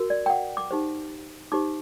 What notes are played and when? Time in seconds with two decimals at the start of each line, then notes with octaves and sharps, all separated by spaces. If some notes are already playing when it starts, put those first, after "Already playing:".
Already playing: F#4 A#4
0.10 D5
0.26 G5
0.30 F#5
0.57 D6
0.71 D#4 G4 C5
1.52 D#4 G4 C5 D6